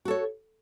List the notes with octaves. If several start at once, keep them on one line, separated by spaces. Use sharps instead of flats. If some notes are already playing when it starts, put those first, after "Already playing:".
F#4 A4 C#5